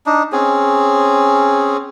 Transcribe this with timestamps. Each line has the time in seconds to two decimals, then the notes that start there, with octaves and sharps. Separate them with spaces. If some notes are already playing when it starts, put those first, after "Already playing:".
0.06 D4 D#4
0.32 C4 C#4 G#4